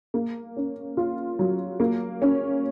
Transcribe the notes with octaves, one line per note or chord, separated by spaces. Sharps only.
A#3
C#4
F4
F#3
A#3
C#4